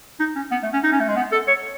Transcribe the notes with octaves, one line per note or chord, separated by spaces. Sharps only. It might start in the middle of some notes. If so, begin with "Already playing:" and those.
D#4
C#4
B3
A3
C#4
D#4
C#4
A3
G#3
B3
A4
C#5